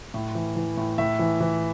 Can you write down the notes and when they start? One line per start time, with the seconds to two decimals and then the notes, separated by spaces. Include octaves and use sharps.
0.14 A2
0.35 E3
0.56 E3
0.77 A2
0.98 A2 E5
1.19 E3
1.40 E3